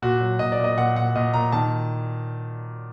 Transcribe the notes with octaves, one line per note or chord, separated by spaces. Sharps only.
A#2 F#4
F#3
A#2 D#5
D5
A#2
D#5
A#2 F#5
A#2 F#5
A#2 D#5
A#2 A#5
D#3 A5